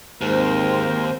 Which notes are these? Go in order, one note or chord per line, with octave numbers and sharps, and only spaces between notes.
D#2 G#2 C4 A#4 C5